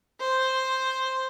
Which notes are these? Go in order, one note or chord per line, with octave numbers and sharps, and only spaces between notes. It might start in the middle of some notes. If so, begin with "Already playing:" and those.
C5